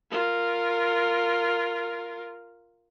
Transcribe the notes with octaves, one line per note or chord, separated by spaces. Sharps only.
F4 A#4